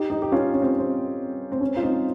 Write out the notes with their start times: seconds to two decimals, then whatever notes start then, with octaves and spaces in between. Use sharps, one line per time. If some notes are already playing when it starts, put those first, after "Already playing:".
Already playing: D#4 G4
0.10 D#4 G4
0.22 G4
0.32 C#4 F4
0.53 C#4
0.62 C4
0.79 C4
1.52 C4
1.61 C#4
1.77 F4
1.83 C4 D#4